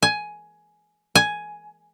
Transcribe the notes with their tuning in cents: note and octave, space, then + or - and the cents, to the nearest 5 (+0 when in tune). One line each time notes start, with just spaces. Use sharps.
G#5 +10
G#5 +5